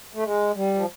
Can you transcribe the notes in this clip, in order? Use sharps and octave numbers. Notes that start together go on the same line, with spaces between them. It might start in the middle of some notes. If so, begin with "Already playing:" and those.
A3
G#3
G3
F3